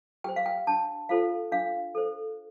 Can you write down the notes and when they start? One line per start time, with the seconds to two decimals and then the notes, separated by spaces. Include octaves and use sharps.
0.24 G4 C5 G5
0.36 F5
0.46 G5
0.67 D4 A5
1.09 F4 A4 C5 F5
1.52 D4 F5
1.95 A4 C5